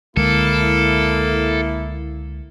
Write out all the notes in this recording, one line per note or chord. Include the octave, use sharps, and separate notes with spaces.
C#2 D3 G#3 A#3 E4 A4